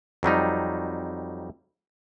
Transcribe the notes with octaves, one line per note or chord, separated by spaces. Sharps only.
F2 F#3 G3 D#4